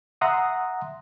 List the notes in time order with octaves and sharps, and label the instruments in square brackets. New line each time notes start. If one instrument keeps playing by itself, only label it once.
[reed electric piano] E5 F#5 A#5 C6 D#6